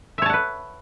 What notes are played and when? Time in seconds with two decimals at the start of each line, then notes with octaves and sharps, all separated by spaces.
0.18 E5
0.22 C#5
0.26 A5
0.30 F#5
0.33 B4